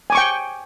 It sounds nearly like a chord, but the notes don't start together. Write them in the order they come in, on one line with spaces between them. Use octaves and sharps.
G#5 D6 C#6 G5